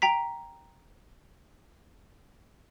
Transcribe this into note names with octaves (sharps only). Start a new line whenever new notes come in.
G5 A#5 B6